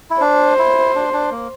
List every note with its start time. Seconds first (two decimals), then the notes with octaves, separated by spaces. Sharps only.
0.10 E4
0.21 D4 C5
0.59 E4
0.95 D4
1.13 D4
1.31 A#3